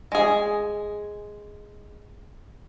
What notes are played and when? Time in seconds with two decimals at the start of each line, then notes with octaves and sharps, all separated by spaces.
0.12 G#3 G#4